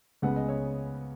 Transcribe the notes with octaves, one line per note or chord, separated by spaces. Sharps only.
C#2 C#3 G#3 B3 F#5
D#5
C#5